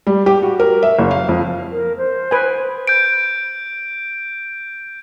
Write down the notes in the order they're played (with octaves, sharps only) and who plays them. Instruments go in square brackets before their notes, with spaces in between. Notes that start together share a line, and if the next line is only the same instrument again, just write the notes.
[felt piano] G3
G4
F#4
A#4
E5
F#1
F5
F2
[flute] A#4
C5
[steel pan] B4 G#5
[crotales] G6 D7